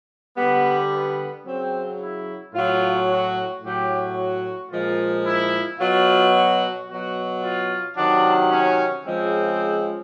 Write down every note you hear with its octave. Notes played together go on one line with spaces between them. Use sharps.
D3 G3 B3
B3
C#3 F#3 C4
E4
A2 F#3 F4
F#4
A2 F#3 G4
F#4
A#2 F3 G#3 F4
E4
B2 F#3 F4
F#4
B2 F#3 F#4
F4
C3 D#3 F#3 D4
C#4
C#3 F3 G#3 C4